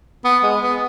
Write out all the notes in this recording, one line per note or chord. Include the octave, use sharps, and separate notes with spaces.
B3
G#3
B3